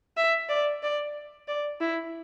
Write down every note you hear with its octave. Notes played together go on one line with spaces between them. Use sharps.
E5
D5
D5
D5
E4